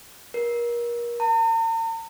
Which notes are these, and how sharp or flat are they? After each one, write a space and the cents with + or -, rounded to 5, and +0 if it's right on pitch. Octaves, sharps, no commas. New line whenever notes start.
A#4 +30
A#5 -45